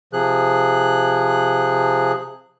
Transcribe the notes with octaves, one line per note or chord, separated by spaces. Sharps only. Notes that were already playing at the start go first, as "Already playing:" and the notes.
C3 F3 G#4 F#6